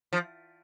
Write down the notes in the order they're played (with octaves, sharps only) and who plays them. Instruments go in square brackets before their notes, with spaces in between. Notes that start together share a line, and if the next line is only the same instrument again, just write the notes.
[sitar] F3